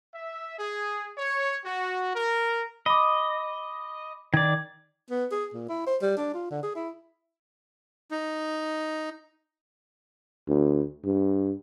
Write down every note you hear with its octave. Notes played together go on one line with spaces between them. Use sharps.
E5
G#4
C#5
F#4
A#4
D#5 B5 D6
D#3 D5 G#6
B3
G#4
A#2
E4
C5
G3
D4
F4
D3
G#4
E4
D#4
D2
G2